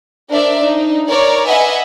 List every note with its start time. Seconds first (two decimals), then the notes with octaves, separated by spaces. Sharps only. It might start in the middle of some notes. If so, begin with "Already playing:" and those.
0.31 D4 A#4 C5 D5 E5
0.63 D4 D#4
1.07 A#4 C#5 D5
1.47 B4 D#5 E5 F#5 G#5